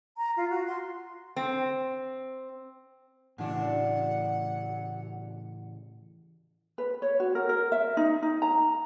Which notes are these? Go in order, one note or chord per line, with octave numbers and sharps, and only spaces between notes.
A#5
F4
F#4
C6
C4
F#2 A2 C#3 E3 D4 F#5
B4
C#5
F#4
A#4
A#4
E5
D#4
D#4
A#5